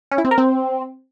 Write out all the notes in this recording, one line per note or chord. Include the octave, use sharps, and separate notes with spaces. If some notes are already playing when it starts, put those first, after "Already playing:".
C#4
E4
C4
A#4
C4